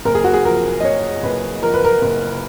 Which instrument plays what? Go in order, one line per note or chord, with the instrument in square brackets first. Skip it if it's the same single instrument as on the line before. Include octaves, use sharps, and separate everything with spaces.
[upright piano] F#1 A#4
G#4
F#4
G#4
F3 A#4
D#5
F#1 C#5
F#1 B4
F3 A#4
B4
A#4
F#1